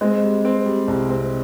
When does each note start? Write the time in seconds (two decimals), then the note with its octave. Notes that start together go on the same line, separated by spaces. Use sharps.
0.01 G#3 C4
0.23 G3
0.45 C4
0.65 G3
0.88 C2
1.09 C4